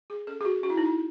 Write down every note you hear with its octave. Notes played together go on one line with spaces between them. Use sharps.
G#4
C#4 A4
G#4
F#4
C#4 F#4
E4
D#4
E4